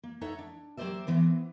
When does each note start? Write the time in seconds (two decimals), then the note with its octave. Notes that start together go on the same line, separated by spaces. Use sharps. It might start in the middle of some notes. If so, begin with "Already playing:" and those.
0.04 A#3
0.21 D#4 A4 C#5 E5 F#5
0.38 D4
0.77 F#3 A#3 G4 C5 D5 E5
1.07 E3 B3 C4